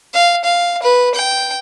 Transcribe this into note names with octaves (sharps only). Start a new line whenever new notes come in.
F5
F5
B4
G5